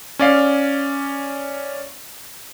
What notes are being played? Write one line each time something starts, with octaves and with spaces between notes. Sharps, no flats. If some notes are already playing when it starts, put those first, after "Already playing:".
C#4 D5 F5